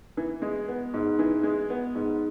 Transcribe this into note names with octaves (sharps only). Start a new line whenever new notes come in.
E3
G#3
B3
G#2
E3
G#3
B3
G#2